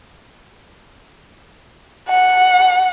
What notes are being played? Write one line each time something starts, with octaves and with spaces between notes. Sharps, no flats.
F#5